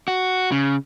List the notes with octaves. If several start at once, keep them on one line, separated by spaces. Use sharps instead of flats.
F#4
C#3